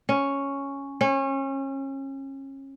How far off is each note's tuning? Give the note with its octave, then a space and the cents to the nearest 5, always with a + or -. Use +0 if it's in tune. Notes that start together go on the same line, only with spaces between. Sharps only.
C#4 +0
C#4 -30